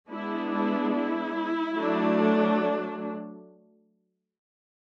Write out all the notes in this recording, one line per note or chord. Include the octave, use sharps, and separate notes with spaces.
G#3 B3 D4 E4
E4
E4
F#3 A3 D4